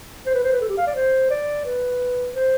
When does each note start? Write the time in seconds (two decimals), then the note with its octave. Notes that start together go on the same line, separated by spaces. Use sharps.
0.26 C5
0.34 B4
0.44 C5
0.53 B4
0.61 A4
0.69 G4
0.78 F5
0.87 D5
0.95 C5
1.30 D5
1.66 B4
2.35 C5